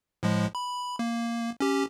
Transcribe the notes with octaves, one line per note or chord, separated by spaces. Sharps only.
A2 F3 G#3
B5
A#3
C#4 G4